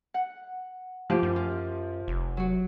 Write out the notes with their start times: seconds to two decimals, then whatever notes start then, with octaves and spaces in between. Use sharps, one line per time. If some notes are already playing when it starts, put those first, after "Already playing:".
0.14 F#5
1.10 F3 A#3 G4
1.23 F#2
1.36 F4
2.08 F1
2.37 F#3 F#4